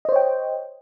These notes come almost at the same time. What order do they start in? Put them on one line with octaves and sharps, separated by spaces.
D#5 C5 C#5 G5